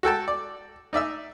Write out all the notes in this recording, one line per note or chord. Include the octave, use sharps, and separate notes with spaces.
F#4 A4 G5 A5
D5
D#4 D5 E5 E6